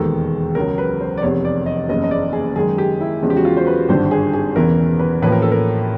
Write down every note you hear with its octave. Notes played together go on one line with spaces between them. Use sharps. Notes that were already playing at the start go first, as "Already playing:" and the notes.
Already playing: E1 D#2 D#3 G#3 A4
C#2 C#3 F#3 A#4
B4
C5
D5
F1 E2 C3 C#5
D5
D#5
F#1 E2 C#3 D#5
D#5
D5
G#4
F#2 D#3 G#3 G#4
G4
E4
E2 C#3 F3 G#3
G4
F#4
F4
C5
B4
G#1 G2 D3 C5
G#4
G#4
E1 E2 C#3 E3 A#4
B4
A1 A2 F3 A#3 C#4 B4
A#4
A4
A#4